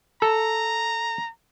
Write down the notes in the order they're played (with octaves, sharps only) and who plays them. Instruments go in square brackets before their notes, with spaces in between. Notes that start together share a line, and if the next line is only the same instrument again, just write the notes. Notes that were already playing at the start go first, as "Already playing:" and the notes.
[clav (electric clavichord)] A4 [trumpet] A#5